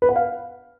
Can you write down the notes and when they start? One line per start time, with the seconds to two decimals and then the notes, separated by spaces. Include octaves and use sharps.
0.02 B4
0.09 F#5
0.16 F5